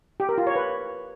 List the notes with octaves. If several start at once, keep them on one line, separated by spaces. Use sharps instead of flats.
G4
A#4
F4
C#5
B4